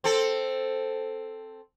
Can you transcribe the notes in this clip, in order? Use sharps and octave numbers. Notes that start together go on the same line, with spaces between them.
C4 A4